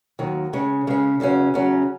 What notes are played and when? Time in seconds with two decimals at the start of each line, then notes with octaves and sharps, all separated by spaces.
0.19 D#2 D#3 F#3
0.53 C#3 G#3 C#4
0.87 C#3 G#3 C#4
1.20 E2 C#3 F#3 C#4
1.54 E2 C#3 F#3 C#4